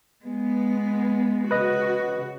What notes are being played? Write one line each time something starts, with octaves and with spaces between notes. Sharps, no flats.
G#3 B3
C#3 F#4 B4 D#5